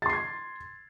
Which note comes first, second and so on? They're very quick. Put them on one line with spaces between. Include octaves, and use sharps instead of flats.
A6 C6 C7 G#6